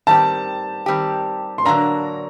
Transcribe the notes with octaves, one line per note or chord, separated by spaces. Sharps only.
D#3 G3 C4 G4 A5
D#3 G3 C4 G4
C6
D3 F#3 A#3 D4 A#5